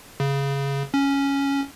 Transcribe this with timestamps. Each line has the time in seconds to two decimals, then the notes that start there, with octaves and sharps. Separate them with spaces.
0.20 C#3
0.94 C#4